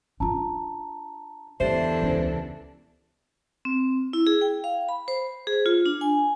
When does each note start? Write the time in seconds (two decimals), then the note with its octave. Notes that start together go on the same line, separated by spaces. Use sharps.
0.20 D4 F4 A5 A#5
1.60 E2 D3 D4 G4 A4 C5 E5
2.02 C#2
3.65 C4
4.13 E4
4.27 G#4
4.41 G5
4.64 F5
4.89 B5
5.08 C5
5.47 G#4
5.66 F4
5.86 D4
6.01 G#5